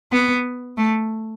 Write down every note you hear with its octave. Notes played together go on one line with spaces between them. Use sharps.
B3
A3